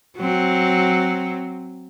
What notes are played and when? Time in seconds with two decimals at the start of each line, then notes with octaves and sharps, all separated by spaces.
0.17 F#3 C4